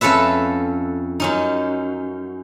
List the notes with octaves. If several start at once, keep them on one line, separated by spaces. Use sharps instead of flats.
F2 C#4 A4 B4 E5
F#2 C#4 D#4